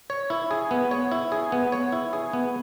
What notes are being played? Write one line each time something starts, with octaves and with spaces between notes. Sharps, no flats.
C#5
E4
G#4
B3
C#5
E4
G#4
B3
C#5
E4
G#4
B3